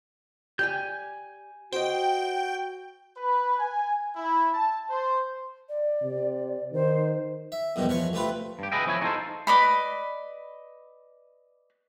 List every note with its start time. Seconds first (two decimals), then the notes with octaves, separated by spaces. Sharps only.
0.59 G4 D5 G5 G#5 G6
1.72 F#4 C5 D#5 G5
3.17 B4
3.59 G#5
4.16 E4
4.54 A5
4.90 C5
5.69 D5
6.03 C3
6.73 D#3 C5
7.52 E5
7.76 E2 G2 B2 D#3 F3
7.89 E3 F3 C#5 C#6
8.13 D2 C3 A3 F4 B4
8.59 G2 G4
8.72 G#4 B4 D#5 E5 G5
8.86 F3 E4 C#5 E5 G#5
9.01 B3 D#4 F4 G4 A4 C5
9.47 B4 D5 D#5 B5